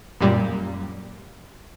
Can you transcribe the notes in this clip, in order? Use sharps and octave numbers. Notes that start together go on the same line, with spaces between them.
F#2 A#2 G3